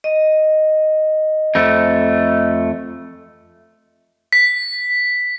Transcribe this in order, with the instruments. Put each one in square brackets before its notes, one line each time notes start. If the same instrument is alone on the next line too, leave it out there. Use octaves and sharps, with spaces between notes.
[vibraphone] D#5
[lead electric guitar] F2 A3
[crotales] B6